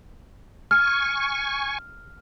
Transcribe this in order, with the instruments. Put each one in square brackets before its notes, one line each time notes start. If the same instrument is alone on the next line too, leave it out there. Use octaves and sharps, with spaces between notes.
[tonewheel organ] G#5 C#6 [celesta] F6